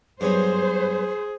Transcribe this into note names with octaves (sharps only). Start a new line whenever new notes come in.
G2 F#3 B3 G#4 C5